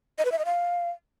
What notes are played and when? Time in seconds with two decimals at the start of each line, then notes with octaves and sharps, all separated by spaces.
0.18 D#5
0.25 B4
0.32 E5
0.39 D#5
0.45 F5